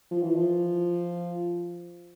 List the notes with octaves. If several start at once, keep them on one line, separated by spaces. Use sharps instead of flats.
F3
E3
F3